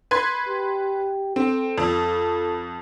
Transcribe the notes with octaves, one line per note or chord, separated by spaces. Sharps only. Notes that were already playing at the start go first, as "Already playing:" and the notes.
B4 C6 G#6
G4
C4 A4
F2